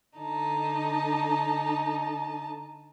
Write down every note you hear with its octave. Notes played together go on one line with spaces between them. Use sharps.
D3 D#4 A5